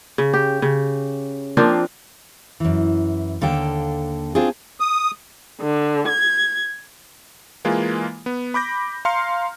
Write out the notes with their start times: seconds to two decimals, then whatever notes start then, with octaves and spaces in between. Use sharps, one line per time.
0.18 C#3
0.33 G4
0.62 C#3
1.57 F3 A#3 C4 D4
2.60 F#2 E3
3.41 D#2 D3 A#3 A4 G5
4.35 C4 D4 F4 G#4
4.80 D#6
5.61 D3
6.10 G#6
7.65 E3 G#3 A#3 F4
8.26 B3
8.54 B5 D6 G6 A#6
9.05 F5 A#5 C6 F6 C#7